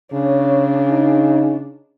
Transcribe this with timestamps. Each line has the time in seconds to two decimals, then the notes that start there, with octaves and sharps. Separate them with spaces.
0.12 C#3 D4 C#5
0.90 D#4